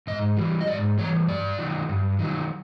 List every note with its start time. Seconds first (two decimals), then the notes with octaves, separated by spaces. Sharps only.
0.07 G#2 D#5
0.37 E3 G3
0.61 D#5
0.67 G#2 D5
0.98 E3 G3 C#5
1.28 G2 D5
1.58 D#3 F#3
1.89 G2
2.19 D#3 F#3